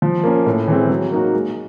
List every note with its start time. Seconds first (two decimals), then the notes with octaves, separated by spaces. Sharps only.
0.02 F3
0.24 A#3 C#4
0.46 A2
0.68 E3 G#3 C4
0.90 F#3
1.12 A#3 D#4 F#4
1.34 G#3